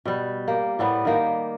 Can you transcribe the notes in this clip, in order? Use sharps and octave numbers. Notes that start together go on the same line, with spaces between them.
B2 G3
A#3 G4
A2 G3 B3
D#3 A#3 G4